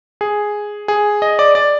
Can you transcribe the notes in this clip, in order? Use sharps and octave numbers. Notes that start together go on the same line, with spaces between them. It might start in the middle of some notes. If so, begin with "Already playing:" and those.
G#4
G#4
D#5
D5
D5